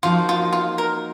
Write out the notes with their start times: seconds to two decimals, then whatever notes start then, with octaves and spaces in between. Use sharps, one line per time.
0.03 F3 A#3 D#4 F4 F#4
0.29 F4
0.53 F4
0.78 A#4